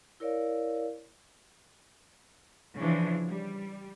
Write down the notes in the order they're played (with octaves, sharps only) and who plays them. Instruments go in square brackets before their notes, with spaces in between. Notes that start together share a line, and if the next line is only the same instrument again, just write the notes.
[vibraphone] E4 A#4 C#5 D5 F5
[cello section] C#3 E3 F3 D4
G3